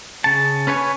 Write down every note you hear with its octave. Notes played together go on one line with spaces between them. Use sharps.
C#3 A5
C#4 B4 C#5 G#5